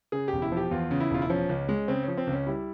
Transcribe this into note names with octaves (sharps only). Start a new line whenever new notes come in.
C#3 G#4
E1 G4
E4
F3 G4
E2 F4
C#3
E4
E1 F4
E4
F3 C#4
C#2
G#3
C#3 C4
C#4
F3
C4
C#2
C#4
G3 E4